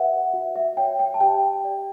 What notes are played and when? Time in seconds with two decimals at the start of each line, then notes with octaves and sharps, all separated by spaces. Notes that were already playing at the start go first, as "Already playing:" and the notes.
Already playing: G4 B4 E5 F#5
0.34 F#4
0.56 E5
0.77 C#5 G5
0.99 G5
1.14 A5
1.20 G4 G5
1.64 D5